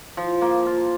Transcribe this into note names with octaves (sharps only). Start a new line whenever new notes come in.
F3
A#3
F4